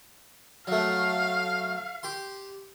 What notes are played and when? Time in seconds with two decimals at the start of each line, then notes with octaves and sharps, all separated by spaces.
0.67 F#3 A3 F5
2.03 G4 C6